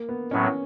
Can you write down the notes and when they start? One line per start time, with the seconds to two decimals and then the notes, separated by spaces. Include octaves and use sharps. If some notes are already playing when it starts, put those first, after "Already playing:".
Already playing: A#3
0.09 B3
0.31 A2 F#3 B3 C#4